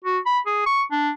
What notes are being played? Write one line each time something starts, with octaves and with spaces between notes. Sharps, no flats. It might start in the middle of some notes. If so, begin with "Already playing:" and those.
F#4
B5
G#4
C#6
D4